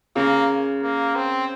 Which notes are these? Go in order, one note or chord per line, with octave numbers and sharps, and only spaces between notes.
C#3 A#3
A#3
C4